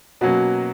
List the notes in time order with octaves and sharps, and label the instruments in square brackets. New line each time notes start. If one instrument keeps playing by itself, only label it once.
[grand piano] B2 F#3 A#3 C#4 [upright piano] F#4